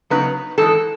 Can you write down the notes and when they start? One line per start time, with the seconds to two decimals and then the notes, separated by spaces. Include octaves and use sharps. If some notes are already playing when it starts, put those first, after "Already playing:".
0.10 C#3 F#3 B3 D#4 B4
0.58 G#2 E3 G#3 A4